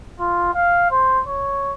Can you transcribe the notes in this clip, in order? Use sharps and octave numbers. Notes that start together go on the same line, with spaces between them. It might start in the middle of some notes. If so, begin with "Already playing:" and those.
F4
F5
C5
C#5